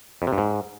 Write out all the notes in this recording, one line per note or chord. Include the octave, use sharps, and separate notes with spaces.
F2
C3
G2
G#2